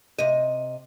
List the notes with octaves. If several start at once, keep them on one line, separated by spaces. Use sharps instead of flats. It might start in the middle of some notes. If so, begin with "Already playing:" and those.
C3 D#5